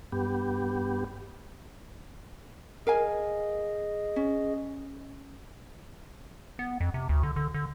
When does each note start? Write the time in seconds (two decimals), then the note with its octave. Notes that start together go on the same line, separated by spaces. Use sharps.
0.12 G2 B3 G4
2.87 G#4 A#4 D#5 F5 G#5
4.16 C#4
6.59 B3
6.81 F2
6.94 C3
7.09 D2
7.23 D3
7.36 D3
7.54 D3